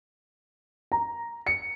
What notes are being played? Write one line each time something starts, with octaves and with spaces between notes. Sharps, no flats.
A#5
C#7